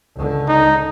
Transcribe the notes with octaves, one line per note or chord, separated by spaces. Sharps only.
C#2 D3
D#4